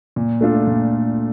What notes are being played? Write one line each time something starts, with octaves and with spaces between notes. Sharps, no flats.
A#2
A3 D4 F4 A4
A#2